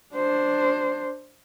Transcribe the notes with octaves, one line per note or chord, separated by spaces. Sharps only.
D4 C5